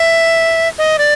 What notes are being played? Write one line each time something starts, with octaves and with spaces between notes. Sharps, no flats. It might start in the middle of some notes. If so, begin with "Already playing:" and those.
Already playing: E5
D#5
D5